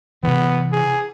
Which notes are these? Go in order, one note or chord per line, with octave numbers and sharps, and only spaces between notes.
C3 E3 B3
G#4